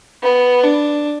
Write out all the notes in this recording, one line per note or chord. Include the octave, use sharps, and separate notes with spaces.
B3
D4